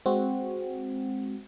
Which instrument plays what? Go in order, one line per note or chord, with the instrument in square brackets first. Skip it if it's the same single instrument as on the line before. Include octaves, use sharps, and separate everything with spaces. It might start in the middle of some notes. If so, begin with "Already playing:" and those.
[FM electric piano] G#3 C4 F#4